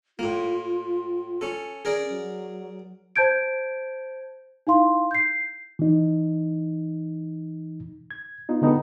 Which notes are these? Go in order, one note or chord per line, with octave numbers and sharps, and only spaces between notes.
A2 A#3 F4
C#4 A4
C#4 G#4 A#4 D5
F#3
C5 A5 G6 G#6 D7
D#4 E4 F5 C6
G6 C7
E3 D#4
G#6
B3 D#4 F4
D3 G#3 B3 D#4 G4 A4